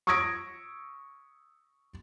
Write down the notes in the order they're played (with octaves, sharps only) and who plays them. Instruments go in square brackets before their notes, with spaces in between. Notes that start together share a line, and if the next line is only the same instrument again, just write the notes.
[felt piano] C#6 D#6 E6 G#6 A#6 D7